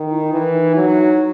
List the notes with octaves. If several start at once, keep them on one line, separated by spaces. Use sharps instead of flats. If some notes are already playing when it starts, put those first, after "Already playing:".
Already playing: D#3
E4
E3 E4
D#4
F#3 D#4